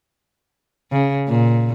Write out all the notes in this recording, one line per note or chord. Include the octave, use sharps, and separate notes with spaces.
C#3
A#2